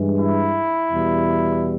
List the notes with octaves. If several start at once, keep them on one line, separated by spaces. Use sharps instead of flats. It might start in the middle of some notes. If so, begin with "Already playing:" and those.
Already playing: G2 E3 G#3
E4
E2 B2 G3